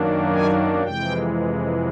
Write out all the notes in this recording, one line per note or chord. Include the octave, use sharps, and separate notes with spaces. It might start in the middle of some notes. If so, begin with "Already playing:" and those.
Already playing: F#2 D#3 F#3 A#3 D4
G#5
F2 C3 E3 G#3 G5